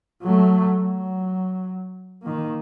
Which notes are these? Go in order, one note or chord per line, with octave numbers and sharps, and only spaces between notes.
F#3 A3
F#3
D#3 A#3